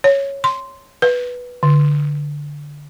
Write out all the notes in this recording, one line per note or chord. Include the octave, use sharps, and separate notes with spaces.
C#5
C6
B4
D3